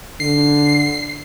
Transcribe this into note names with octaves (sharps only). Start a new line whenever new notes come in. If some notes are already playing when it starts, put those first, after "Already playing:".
D3 C7